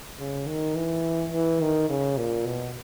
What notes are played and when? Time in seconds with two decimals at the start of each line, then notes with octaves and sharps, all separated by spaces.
0.19 C#3
0.47 D#3
0.75 E3
1.32 E3
1.60 D#3
1.90 C#3
2.18 A#2
2.46 B2